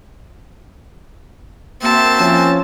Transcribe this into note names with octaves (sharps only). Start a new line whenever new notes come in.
A#3 C4 F#4 E5 A5
F3 C#4